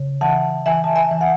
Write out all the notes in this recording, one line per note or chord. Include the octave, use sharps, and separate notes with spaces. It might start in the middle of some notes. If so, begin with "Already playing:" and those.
Already playing: C#3
E3 F#5 A5
E3 E5 G#5
A5
E5 G#5
E3
F#5